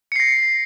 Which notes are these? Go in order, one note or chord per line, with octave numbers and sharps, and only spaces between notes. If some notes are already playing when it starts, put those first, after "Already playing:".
A#6 C7 C#7